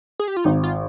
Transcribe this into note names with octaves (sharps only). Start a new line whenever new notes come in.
G#4
G4
F4
G#1 D#4
F4